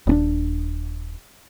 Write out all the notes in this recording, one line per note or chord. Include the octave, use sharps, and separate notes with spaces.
D#1 C4 D4